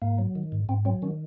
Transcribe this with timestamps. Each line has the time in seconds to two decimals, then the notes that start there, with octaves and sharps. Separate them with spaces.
0.02 G#2 A#3
0.18 F#3
0.35 D#3
0.52 G#2
0.69 G#2 C4
0.85 F#3 C4
1.02 D#3 C#4